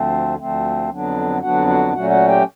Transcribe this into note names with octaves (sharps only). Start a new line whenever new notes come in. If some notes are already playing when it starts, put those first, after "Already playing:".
Already playing: D2 D3 F3 A3 C4
D2 D3 F3 A3 C4
F2 D3 F#3 B3 D4
F2 D3 F#3 B3 D4 F#4 F#5
F#4 F#5
A#2 F#3 A3 C#4 F#4 F#5
F#4 F#5
G4 G5